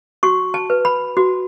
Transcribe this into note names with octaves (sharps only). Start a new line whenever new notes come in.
F#4 C#6
A5
B4
B5
F#4